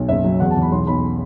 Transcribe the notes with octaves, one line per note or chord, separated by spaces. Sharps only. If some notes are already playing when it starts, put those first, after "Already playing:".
Already playing: B1
F#1 E5
F#3
E2 F#5
A5
E2
B5
B1 C6
B1 B5